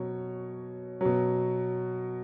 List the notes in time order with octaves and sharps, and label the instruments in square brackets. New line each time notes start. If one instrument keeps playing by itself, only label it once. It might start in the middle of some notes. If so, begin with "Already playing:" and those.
Already playing: [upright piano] B2 F#3 C#5
B2 F#3